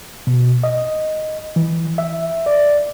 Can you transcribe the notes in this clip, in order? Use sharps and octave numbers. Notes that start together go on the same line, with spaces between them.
B2
D#5
E3
E5
D5